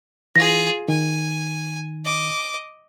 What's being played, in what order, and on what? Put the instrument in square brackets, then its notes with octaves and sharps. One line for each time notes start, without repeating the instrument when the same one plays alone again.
[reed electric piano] E3 [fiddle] F4 G#4 [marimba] A#6
[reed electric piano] D#3 [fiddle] G#5
[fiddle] D#5 D6